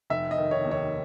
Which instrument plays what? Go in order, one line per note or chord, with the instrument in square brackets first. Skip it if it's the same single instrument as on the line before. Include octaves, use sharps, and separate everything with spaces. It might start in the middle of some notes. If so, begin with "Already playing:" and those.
[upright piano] F1 E5
D#5
D#3
C#5
D#2
C#5